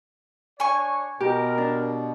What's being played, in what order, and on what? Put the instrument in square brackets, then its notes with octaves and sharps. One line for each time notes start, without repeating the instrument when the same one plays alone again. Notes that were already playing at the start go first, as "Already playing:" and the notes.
[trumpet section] D4 C#5 [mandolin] G#5 C#6
[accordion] B2 [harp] G4 [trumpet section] A#4
[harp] D4